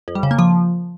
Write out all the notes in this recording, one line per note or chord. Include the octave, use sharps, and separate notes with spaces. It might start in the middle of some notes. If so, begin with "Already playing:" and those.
F2
G3
C#3
A#3
F3